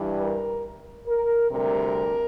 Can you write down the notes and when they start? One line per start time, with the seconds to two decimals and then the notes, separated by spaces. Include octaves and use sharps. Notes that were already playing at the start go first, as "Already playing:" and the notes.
Already playing: G2 E3 G3
0.19 A#4
1.07 A#4
1.50 D2 C3 G3 A#4